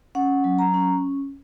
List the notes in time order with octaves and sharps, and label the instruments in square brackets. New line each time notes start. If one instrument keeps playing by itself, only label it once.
[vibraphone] C#4 F#5
F#3
A#5
C#4